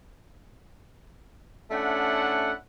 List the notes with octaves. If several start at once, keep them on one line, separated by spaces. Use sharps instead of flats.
A3 C#4 D4 E4 F#5